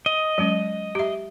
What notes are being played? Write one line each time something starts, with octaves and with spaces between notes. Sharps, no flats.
D#5
F#3 G#3 C#4
G4 E5